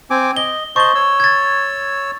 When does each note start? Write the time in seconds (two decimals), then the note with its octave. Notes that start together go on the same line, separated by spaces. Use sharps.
0.10 C4 G#5 D6
0.37 D#5 G7
0.76 C5 D#5 A5 C#6 G7
0.95 C#5 E6
1.20 G#6 A6